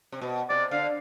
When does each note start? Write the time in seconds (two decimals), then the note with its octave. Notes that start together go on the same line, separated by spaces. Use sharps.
0.12 C3
0.22 B2
0.49 C3 D5
0.71 D3 F5